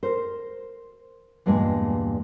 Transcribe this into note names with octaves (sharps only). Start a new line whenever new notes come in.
A#4 C5
E2 G2 A#2 G#3